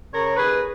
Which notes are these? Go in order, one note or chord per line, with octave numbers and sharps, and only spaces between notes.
C#3 A#4 C#5
D#2 G#4 B4